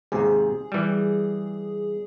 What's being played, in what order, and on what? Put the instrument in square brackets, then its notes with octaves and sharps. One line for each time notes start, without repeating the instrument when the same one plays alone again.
[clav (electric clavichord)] D#2 G#2 C3 [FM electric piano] G#4
[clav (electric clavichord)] E3 G3